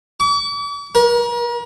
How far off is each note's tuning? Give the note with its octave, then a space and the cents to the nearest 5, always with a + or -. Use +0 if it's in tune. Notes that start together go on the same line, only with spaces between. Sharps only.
D6 -45
A#4 +40